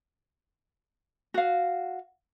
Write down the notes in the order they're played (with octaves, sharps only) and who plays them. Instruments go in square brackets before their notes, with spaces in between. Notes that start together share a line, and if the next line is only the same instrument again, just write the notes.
[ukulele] F#4 F5